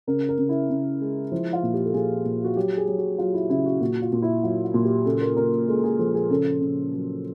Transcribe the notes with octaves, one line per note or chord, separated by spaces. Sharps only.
C#3 A#4
A#4
C#3
E4
C#3
G#3
F3 E4
F4
A#2
G4
A4
A#2 G#4
A#2
F#4
F#3 G4
G#4
F#3
F#4
F#3 F4
E4
C#3 E4
F#4
A#2 F#4
F4
A#2
E4
F#3 F4
F4
A#2
G4
C#3 A4
A#4
C#3 A#4
G#3 A4
G#4
F3 A4
G#4
C#3 A4
C#3
F#3